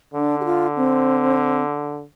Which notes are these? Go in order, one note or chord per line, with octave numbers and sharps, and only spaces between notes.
D3 D4
G4
F4
C4